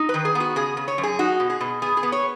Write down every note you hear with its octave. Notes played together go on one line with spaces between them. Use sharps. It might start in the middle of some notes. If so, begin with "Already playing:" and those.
Already playing: D#4
B4
D#3
G#4
B3
F#4
C#3 G#4
C#3
C#5
F#2
G#4
D#4 F#4
B2
G#4
B2
B3 G#4
G#4
B3
C#5